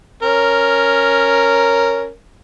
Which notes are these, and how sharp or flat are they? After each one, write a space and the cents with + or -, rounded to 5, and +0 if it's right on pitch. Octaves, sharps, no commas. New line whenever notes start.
C#4 +0 A#4 +0